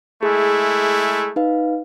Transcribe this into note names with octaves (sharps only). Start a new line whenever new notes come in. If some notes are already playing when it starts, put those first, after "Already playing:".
G#3 A3 E4 G#4
D#4 B4 F5